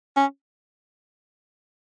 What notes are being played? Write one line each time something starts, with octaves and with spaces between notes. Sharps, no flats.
C#4